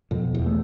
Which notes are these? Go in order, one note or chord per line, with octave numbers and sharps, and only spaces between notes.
F2 B2
E2
A3